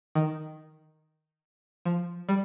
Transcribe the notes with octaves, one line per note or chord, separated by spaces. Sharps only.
D#3
F3
G3